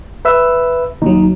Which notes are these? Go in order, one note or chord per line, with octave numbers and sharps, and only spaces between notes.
B4 E5 E6
D#2 F#3 D#4